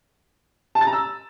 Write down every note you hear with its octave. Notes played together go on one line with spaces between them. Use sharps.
A5
A6
A#5
E6